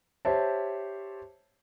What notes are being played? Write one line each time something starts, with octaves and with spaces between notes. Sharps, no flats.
G4 C5 C#5 E5 A5